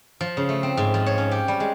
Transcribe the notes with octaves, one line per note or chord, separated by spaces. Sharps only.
F3
C#3
A3
C4
G#2
F3
C#5
C#4
G4
G3
G#3